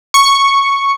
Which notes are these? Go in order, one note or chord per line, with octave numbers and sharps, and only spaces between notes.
C#6